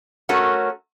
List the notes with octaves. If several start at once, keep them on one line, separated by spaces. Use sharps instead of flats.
A3 C#4 F#4 A#4